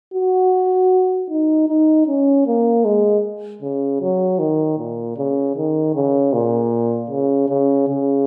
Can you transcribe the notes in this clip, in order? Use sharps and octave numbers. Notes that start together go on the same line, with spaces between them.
F#4
D#4
D#4
C#4
A#3
G#3
C#3
F#3
D#3
A#2
C#3
D#3
C#3
A#2
C#3
C#3
C#3